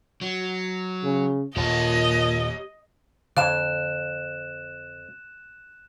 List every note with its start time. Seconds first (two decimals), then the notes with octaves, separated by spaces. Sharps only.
0.21 F#3
1.03 C#3
1.56 D#1 A#2 G4 C#5 D#5 A5
3.37 F2 D3 C#5 F5 F#6 E7